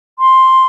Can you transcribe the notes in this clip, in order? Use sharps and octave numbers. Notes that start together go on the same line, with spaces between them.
C6